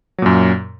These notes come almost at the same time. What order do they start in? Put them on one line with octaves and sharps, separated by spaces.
F#3 A#2 F#2